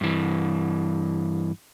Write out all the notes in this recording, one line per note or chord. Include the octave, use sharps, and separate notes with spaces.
G2 E3